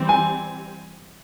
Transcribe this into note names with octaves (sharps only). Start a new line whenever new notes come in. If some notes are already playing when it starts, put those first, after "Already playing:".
Already playing: E3 G3 C4
G#5